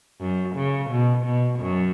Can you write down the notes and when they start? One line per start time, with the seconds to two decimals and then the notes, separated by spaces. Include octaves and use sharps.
0.21 F#2
0.56 C#3
0.91 B2
1.25 B2
1.60 F#2